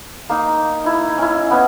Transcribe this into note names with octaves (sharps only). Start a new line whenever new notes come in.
A#3 D#4
D#4 E4
C#4 E4
B3 C#4 D#5